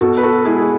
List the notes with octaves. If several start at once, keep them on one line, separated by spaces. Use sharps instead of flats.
B2 F#4 A4
B4
F#4 A4
G#3 E4 G#4
G#4